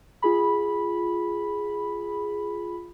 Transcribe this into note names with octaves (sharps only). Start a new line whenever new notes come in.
F4 G#4 B5